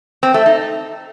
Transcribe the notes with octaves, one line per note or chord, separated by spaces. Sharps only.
C4
A3
D#4